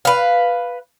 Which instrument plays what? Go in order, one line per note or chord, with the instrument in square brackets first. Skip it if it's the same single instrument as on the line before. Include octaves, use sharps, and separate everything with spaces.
[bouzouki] B4 F5